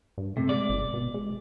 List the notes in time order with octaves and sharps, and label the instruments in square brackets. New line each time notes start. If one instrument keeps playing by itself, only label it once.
[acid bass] G2
[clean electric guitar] C3 [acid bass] A3
[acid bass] G#3 [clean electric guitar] D5
[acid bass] G1
B2
G#3